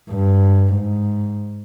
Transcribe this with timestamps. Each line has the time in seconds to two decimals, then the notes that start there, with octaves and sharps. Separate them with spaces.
0.10 G2
0.74 G#2